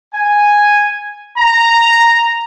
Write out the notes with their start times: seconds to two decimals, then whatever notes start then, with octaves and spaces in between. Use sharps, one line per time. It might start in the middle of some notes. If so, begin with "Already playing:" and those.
0.14 G#5
1.38 A#5